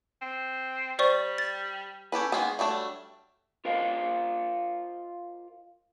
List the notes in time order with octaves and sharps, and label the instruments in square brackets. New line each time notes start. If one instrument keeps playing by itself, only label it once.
[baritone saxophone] C4
[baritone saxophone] G3 [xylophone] C5 D5 C#6
[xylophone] A6
[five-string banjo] C#4 G4 A4 B4
D#3 F#3 G#3 A#3 B3
F#3 G3 A3 D4
[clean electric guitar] F4 A#4 C5 D#5 F5